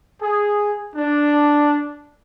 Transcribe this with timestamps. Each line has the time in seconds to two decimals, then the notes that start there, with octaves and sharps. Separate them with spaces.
0.22 G#4
0.95 D4